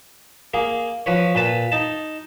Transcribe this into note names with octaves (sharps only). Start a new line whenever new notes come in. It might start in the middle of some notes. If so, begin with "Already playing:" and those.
A#3 G#4
F3 B4 C#5
A#2 B4 A5
D#4 A5